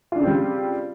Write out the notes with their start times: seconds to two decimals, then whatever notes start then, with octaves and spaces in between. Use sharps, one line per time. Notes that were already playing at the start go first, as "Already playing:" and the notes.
0.12 F4
0.16 D4
0.20 C#3
0.23 C4
0.27 G3